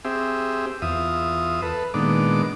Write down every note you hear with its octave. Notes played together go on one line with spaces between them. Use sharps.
C4 G4 G#4 E5
E2 F4 E5 D#6
A4 B4
A#2 D#3 G#3 B3 D4 D6